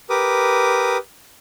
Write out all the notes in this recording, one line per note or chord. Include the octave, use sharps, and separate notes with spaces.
G4 A#4 B4 D6 D#6